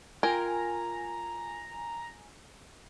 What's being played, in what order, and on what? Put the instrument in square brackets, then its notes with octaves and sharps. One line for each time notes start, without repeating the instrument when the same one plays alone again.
[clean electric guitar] F4 G5 [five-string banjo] A#4 [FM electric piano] G#5 [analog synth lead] A#5